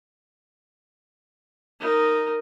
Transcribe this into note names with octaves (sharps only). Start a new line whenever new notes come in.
D#4 A#4